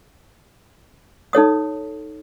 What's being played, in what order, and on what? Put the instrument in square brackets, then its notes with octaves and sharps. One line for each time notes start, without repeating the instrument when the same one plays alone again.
[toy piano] D#4 A4 C#5 D#6